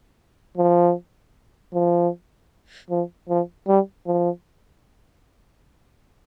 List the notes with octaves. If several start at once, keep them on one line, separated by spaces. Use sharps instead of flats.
F3
F3
F3
F3
G3
F3